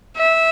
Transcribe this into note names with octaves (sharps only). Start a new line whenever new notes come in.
E5